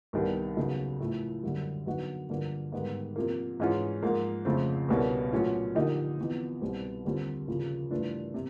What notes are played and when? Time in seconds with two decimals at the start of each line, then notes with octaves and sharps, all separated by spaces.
0.13 C2 C3 D#3 G3 B3
0.56 D#2 C#3 F#3 B3 D#4
1.00 A2 F3 A3
1.44 F#2 D3 G3
1.86 D3 F#3 B3 D#4 F#4
2.30 G2 D3 F3 A#3
2.72 G#2 D#3 G3 B3
3.16 C3 F3 A#3
3.60 G#2 E3 G#3 C#4 F4
4.02 G#2 F3 A#3
4.45 F2 C#3 F3 A3 C4
4.88 C2 B2 G3 A#3 C#4
5.32 A#2 F#3 A3 C#4 F4
5.75 D3 F3 A#3 D#4 G4
6.18 E2 C3 F3
6.61 C2 B2 G3 C4
7.05 D#2 D3 G3 C4 F4
7.48 D#2 C#3 F3
7.91 G2 E3 A3 D4 F4
8.34 C3